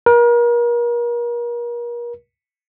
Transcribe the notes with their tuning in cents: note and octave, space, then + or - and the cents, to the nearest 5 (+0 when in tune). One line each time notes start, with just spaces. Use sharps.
A#4 +35